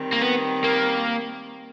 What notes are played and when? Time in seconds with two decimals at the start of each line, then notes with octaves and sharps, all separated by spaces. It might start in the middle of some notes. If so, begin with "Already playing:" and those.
Already playing: D#3 G3 C4
0.13 A#3
0.21 B3
0.64 A#3